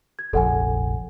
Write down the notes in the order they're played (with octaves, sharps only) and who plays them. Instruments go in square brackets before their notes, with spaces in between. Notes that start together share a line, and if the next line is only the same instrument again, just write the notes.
[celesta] G#6
[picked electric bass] F1 A#1 [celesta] A4 F#5 G#5